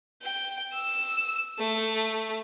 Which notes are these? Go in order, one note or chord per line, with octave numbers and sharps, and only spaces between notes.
G5
E6
A3